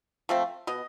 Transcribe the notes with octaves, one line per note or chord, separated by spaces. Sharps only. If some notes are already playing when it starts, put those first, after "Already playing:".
F3 A3 C4
B2 D#5